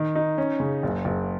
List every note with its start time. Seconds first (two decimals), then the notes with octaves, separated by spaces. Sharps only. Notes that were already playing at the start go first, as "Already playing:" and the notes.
Already playing: D#3
0.15 D#4
0.38 C#4
0.60 C#3
0.83 F#1
1.05 F#1